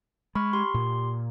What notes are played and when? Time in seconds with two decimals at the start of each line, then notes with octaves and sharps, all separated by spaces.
0.35 G#3 B5 C#6 F6
0.53 G4 C6
0.74 A#2